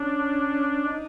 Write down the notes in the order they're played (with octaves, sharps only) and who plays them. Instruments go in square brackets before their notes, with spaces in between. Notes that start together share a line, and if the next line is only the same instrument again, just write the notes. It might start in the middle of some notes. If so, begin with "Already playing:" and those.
Already playing: [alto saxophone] C#4 [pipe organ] D4
[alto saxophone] D#4